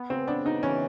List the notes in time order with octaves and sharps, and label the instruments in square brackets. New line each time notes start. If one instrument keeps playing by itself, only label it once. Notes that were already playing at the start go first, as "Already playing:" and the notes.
Already playing: [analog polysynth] B3
[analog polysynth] C#3 [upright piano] C4
[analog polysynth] B3 [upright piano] D4
[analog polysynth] C#3 [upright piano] D#4
[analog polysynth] E3 [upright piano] C#4